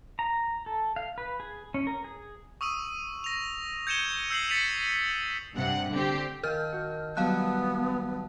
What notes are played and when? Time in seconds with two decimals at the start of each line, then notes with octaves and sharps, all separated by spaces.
0.19 A#5
0.66 A4
0.96 F5
1.18 B4
1.40 G#4
1.74 C#4
1.87 A#4
2.04 G#4
2.61 C#6 D#6 E6 D#7
3.24 A#6 F7
3.87 G6 G#6 C#7 D#7 E7 G7
4.30 E6 G6 C7 D#7 F#7
4.49 A6 B6 C#7 D#7 F7
5.57 G2 C3 F#5
5.94 D3 C4 G4
6.43 D#3 F4 A#4 A5 F6 G6
6.72 F#4
7.17 F#3 G3 B3 F5 A5 F#6